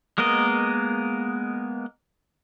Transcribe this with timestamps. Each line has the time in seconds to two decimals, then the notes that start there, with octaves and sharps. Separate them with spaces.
0.18 G#3 A#3 B3 A#4 D#5